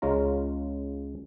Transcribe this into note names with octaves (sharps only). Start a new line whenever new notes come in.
C#2 C#3 G#3 C#4 F4 A#5